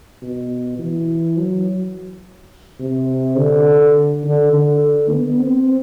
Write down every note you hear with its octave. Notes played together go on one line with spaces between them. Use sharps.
B2
E3
F#3
C3
D3
D3
D3
B3
C4